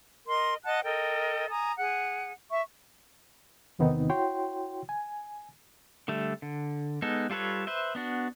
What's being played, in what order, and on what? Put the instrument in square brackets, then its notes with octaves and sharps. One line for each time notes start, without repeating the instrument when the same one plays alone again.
[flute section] A#4 D#5 C6
D#5 F#5 A5 F#6
A4 A#4 D#5 G5
G#5 A#5 D#6
G#4 F#5
E5 C#6
[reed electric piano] E2 C3 D#3 B3 C4 D#4
E4 F#4 C#5 G5 C6
G#5
[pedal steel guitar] D3 G3 A3
D3
G#3 B3 D#4 A4
G3 F4 A4 B4 C#5
B4 C5 E5
B3 D4 F#4